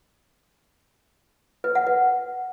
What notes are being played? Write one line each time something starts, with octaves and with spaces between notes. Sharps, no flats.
B4
F#5
B4